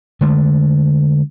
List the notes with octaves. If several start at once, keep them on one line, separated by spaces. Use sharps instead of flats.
D3 G#3 A3